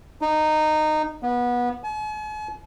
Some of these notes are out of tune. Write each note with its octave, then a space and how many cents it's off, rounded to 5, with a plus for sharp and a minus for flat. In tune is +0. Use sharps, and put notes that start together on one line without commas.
D#4 -15
B3 -20
G#5 +45